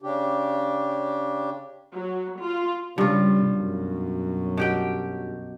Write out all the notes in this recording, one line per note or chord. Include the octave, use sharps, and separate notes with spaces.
C#3 D4 G4
F#3
F4
G2 C#3 G3 F4
B1 F#2
B2 G4 G5